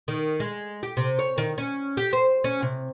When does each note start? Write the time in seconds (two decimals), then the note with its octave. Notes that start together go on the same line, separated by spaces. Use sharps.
0.08 D#3
0.40 G#3
0.83 G4
0.97 C3
1.19 C#5
1.38 D#3
1.58 C#4
1.97 G4
2.13 C5
2.44 C#4
2.62 C3